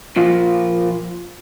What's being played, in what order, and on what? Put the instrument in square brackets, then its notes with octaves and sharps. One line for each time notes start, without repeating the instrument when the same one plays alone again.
[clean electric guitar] A#2 F3 A#3 F4